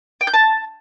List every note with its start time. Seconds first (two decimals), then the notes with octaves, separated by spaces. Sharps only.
0.21 G5
0.27 G6
0.34 A5